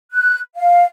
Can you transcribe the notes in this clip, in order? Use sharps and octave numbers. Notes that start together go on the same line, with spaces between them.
F#6
F5